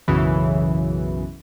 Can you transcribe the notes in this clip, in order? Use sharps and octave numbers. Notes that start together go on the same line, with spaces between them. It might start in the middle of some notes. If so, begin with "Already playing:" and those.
B1 F#2 C#3 E3